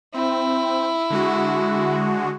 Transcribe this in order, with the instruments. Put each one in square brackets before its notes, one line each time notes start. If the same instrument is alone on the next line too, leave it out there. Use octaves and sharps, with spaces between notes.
[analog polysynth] C4 [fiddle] E4
[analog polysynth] D3 G#3 F#4